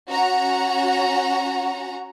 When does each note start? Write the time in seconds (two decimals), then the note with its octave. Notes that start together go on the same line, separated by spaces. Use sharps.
0.10 C#4 F#4 F#5 A#5